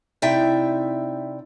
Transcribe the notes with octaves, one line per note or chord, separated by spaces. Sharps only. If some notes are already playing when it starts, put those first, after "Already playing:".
C3 D#4 E4 D5 E5 G5